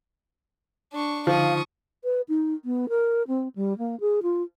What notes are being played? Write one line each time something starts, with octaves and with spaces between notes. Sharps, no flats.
D4 C#6
D3 F3 D#4 F5 C#6 D#6
B4
D#4
B3
A#4
C4
G3
A#3
G#4
F4